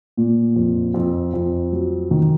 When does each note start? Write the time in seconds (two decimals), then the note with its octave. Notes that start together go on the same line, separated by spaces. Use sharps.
0.17 A#2
0.56 F2
0.94 F2
1.34 F2
1.72 F#3
2.11 D#3